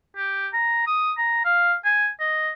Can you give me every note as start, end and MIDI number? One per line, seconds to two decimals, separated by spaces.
0.17 0.48 67
0.53 0.82 82
0.87 1.12 87
1.18 1.40 82
1.45 1.75 77
1.85 2.09 80
2.20 2.51 75